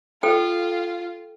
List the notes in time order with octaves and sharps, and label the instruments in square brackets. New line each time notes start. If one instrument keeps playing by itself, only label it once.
[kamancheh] F4 [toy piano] A4 G5